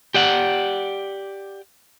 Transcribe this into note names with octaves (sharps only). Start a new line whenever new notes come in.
G4 D5 F#5